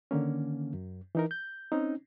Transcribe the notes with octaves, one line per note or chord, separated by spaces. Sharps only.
D3 D#3 A#3 C#4
F#2
E3 D#4 A#4
G6
C4 C#4 D#4